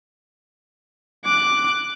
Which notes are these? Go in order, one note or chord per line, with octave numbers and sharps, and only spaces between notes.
D6 F#6